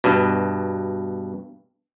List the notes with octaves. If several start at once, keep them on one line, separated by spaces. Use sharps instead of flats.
G2 B2